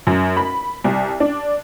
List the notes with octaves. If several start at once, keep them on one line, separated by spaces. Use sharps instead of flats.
F#2
B5
C2
D4